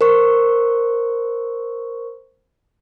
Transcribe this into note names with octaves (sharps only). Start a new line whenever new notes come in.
A#4 C5 C#6